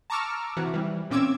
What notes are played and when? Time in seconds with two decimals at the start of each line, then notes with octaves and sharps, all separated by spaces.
0.10 A5 A#5 C#6 D6 E6 F6
0.57 C3 E3 F#4
0.74 E3 G3
1.11 A#2 C4 C#4 D6 E6 G#6